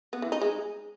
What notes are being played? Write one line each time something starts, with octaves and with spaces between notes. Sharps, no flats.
B3
E3
D#4
G#3